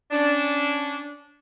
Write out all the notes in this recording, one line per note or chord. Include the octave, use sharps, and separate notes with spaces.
C#4 D4